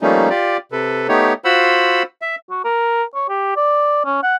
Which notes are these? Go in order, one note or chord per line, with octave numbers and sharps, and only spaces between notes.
F3 G3 A3 A#3 C#4 D#4
F4 G4 D5
C3 A4 B4
A3 B3 D#4 G4 C#5
F4 F#4 C5 F#5 B5 E6
E5
F#4
A#4
C#5
G4
D5
C#4
F#5